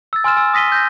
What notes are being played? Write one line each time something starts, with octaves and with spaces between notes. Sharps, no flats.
E6 A6
G#5 C6 E6 F6 A6 E7
G#5 E6
D#6 A#6 B6 D#7 G7
G6 A#6